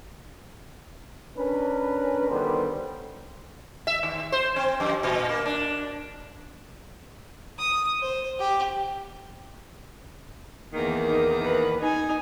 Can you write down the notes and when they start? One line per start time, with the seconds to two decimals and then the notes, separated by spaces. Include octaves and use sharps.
1.37 C#4 D4 A#4 B4
2.30 D2 D#3 G3 B3 C5
3.87 E5
4.03 D#2
4.32 C5
4.56 C4
4.80 F#2
5.03 A#2
5.29 A#3
5.45 D4
7.59 D#6
8.02 C5
8.40 G4
10.73 E2 D#3 A#3
11.09 D#4
11.42 B4
11.81 D#4 G#5